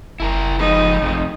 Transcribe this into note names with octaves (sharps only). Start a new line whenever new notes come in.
F#1 E4 A4 A#4
F3 G#3 D#4 B4
G#1 F2 C3